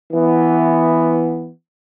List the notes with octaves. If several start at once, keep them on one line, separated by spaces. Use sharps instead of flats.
E3 B3